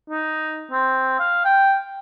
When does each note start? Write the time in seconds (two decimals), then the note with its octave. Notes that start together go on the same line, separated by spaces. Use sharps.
0.10 D#4
0.71 C4
1.20 F5
1.45 G5